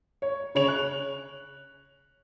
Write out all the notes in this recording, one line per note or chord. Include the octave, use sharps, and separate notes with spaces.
C#5
C#3 C#5 F7
F#6